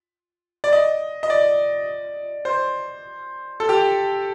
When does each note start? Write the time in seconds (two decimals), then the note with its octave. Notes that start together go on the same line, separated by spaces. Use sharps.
0.64 D5
0.73 D#5
1.23 D#5
1.30 D5
2.45 C5
3.60 A4
3.69 G4